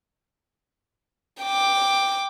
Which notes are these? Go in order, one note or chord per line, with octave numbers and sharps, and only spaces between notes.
G5 D6